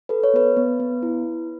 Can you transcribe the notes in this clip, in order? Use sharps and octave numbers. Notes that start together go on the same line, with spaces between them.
A4 B4
C#5
B3 B4
B3
B3
E4